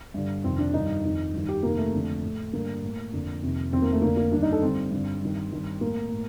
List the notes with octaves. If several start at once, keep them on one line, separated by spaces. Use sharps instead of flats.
G2 D3
F2 C3 D#3 C4
D4
G2 D#3 D#4
F2 D#3
G2 D#3
G4
F2 C3 D#3 A#3
A3
F2 D3
A2
G2 D3 A#3
A2
F2 D3
F2 C3 D#3
F2 D#3 C4
A#3
A3
F2 D3 A#3
A#3
G2 D#3 D4
D#4
A4
G2 C4
D3
G2 D3
G2 D#3
G2 D#3
A2 A#3
A2